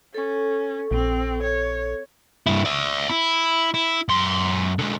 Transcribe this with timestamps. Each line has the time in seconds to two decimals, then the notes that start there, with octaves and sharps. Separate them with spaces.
0.14 C#4 A4 C#6
0.91 A#1 C4
1.43 C#5
2.47 G2 E4
2.65 D5 E5
3.09 E4
3.74 E4
4.09 F#2 C6
4.79 D3 G#3